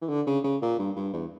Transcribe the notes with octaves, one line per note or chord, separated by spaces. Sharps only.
E3
D3
C#3
C#3
A#2
G2
G2
E2